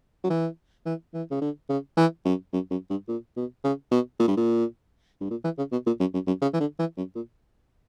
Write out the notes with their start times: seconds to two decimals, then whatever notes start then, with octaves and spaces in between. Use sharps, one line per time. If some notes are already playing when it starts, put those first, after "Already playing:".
0.24 F#3
0.30 E3
0.86 E3
1.14 E3
1.31 C#3
1.41 D3
1.69 C#3
1.97 E3
2.25 F#2
2.53 F#2
2.71 F#2
2.90 G2
3.08 A#2
3.37 B2
3.64 C#3
3.91 B2
4.19 A#2
4.28 G2
4.37 A#2
5.21 G2
5.30 A#2
5.44 E3
5.58 C#3
5.72 B2
5.87 A#2
6.00 F#2
6.14 F#2
6.27 F#2
6.41 C#3
6.53 E3
6.60 D3
6.79 E3
6.97 F#2
7.15 A#2